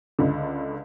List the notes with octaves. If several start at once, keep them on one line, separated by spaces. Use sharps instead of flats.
C#2 D3